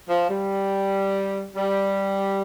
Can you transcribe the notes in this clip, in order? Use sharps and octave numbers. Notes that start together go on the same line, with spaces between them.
F3
G3
G3